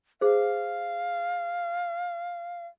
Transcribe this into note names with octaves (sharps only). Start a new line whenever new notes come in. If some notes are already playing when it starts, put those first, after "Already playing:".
G#4 C5 F5